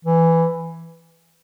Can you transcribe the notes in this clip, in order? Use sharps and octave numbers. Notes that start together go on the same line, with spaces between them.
E3